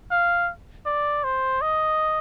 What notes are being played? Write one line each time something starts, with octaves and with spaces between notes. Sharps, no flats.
F5
D5
C5
D#5